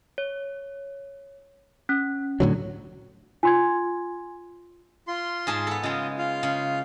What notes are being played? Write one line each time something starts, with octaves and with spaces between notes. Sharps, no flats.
C#5
C#4
A2 D3 F#3
F4 G#5 C6 G#6
F4 C6
G#2 G#4 A5
B3 A4
C#3 G#3 F4 D#5
F4 F5
C#3